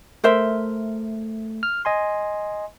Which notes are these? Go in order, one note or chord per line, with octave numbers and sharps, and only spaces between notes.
A3 A#4 C5 E5
F6
D#5 G#5 C6